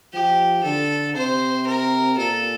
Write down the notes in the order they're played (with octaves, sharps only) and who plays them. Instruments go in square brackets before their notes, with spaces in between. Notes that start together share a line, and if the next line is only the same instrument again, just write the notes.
[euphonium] F3 [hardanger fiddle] G4
[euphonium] D3 [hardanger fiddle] A4
[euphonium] C3 [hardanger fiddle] C5
[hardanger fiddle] A#4
[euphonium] A#2 [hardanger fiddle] A4